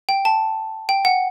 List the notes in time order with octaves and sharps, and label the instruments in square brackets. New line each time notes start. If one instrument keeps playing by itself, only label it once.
[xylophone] G5
A5
G5
F#5